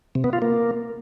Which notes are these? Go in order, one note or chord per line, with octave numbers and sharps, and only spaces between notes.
C3
B3
F4
A#3